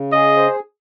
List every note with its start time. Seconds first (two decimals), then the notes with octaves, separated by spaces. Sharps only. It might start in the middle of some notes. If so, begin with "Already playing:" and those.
Already playing: C#3
0.13 G#4 D#5
0.36 C5